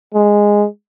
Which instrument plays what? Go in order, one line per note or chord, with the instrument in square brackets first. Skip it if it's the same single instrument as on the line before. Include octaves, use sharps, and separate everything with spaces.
[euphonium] G#3